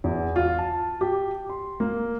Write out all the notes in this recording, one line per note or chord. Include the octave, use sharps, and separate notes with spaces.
E2
F4
A5
G4
C6
A#3